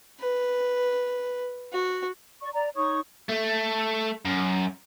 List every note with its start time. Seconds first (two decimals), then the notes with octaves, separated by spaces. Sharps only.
0.20 B4
1.72 F#4
2.42 D5 C#6
2.54 D5 A#5
2.76 D#4 C#5 C#6 D#6
3.29 A3
4.25 F#2